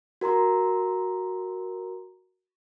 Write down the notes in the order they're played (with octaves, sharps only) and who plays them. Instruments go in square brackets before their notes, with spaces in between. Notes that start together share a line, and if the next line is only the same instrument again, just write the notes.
[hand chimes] F#4 A#4 A#5 C6